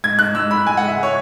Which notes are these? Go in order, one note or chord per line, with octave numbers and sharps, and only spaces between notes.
G#2 G#6
G#2 F#6
G#2 E6
G#2 B5
G#2 G#5
F#5
G#3 E5
G#3 C#5